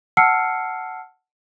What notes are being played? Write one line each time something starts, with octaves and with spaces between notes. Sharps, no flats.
F#5 A5 E6 F6 C7 C#7